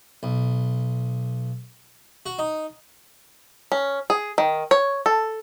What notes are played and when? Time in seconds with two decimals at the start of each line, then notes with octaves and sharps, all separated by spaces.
0.23 B1
2.26 F#4
2.39 D#4
3.72 C#4
4.10 G#4
4.38 D#3
4.71 C#5
5.06 A4